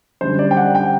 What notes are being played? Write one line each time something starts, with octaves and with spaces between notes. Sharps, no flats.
F#2 D3 G3 C5
D5
G5
F#5
G5